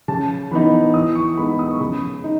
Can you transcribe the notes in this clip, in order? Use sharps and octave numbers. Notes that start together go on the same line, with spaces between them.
C#3 A5
E3 B3 D#4 B5
E3 D#6
C#6
G#3 B3 D#4 B5
D#6
C#6
C#3 B5
D#4